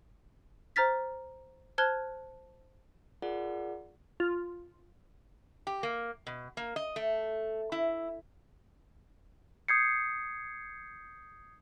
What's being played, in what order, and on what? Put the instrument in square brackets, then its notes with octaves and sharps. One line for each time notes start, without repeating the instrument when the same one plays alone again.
[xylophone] C5 A#5 F6 A6 B6
C5 A5 F6 F#6 G#6 G7
[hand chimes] F4 G#4 A#4 D5 F#5
[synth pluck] F4
[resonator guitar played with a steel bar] G4
A#3
B2
A#3
D#5
A3
E4
[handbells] D#6 G6 G#6 C7 C#7